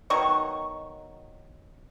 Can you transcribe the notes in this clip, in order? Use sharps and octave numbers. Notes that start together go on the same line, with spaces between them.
B2 D#3 F#3 C#6